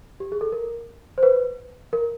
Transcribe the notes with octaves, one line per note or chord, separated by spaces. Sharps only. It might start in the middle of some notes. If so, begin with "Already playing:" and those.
G4
G#4
A4
A#4
C5
B4
A#4